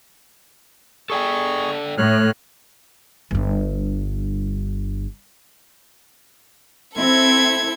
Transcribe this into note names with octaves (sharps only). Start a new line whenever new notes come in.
G#4 A4 D5 G5 C#6
A2 C#5 F6 F#6
G1 G2
C4 E4 A4 G#6